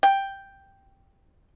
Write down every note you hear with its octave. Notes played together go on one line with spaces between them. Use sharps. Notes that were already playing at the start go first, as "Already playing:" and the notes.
G5